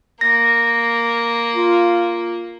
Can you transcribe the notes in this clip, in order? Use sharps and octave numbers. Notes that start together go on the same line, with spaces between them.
A#3 A#6
F4